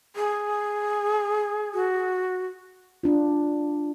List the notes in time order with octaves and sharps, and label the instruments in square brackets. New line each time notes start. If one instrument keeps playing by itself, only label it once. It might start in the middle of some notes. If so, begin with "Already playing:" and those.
[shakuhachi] G#4
[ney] F#4
[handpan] D4 F4